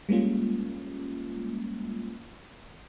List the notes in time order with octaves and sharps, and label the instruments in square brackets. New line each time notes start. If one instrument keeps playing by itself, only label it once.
[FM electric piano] G3 G#3 A#3 C#4 F4